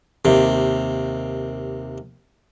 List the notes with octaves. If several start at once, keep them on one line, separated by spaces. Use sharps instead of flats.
D#2 C3